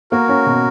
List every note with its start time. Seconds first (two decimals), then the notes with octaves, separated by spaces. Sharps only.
0.11 A#3 F#4 A#4
0.29 C#4
0.47 B2